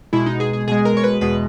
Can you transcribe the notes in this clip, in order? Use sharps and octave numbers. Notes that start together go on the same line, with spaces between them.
B2 G#3 E4
D#4
G#4
G#4
B2 G#3 G#4
A#4
C#5
B4
E2 B2 G#3 B4